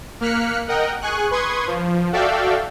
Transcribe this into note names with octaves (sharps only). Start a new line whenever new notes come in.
A#3 F6 F#6 B6 C#7
A#4 D#5 F#5 G5
G#4 G#5 C#6 F#6
B4 C6 C#6 D#6 G#6
F3
F#4 A4 D5 E5 F5 G5